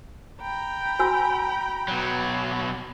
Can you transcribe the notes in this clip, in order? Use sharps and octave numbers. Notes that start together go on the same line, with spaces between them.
G5 A#5 B5
F#4 G#5 E6
B2 F#3